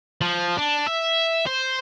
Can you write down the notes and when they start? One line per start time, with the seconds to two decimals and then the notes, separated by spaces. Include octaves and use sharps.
0.21 F3
0.57 D4
0.86 E5
1.46 C5